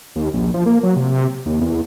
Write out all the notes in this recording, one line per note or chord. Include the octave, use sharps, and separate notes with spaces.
D#2
A#1
F3
A#3
F#3
C3
D#2
E2